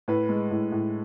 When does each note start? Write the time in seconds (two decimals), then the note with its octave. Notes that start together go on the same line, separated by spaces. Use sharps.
0.08 A2 B4
0.29 G#3
0.51 A2
0.72 A2